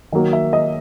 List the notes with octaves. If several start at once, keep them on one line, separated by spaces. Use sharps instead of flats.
D#3 F#3 A#3
E5
D#5